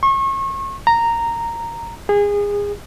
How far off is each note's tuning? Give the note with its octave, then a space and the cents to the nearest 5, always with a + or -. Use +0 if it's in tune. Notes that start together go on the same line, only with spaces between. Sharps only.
C#6 -35
A#5 -10
G#4 -25